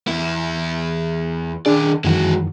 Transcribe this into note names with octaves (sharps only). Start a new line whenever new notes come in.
E2 E4
D#3 D4 G#4 D5
F#2 D#3 E3 G#3 F#4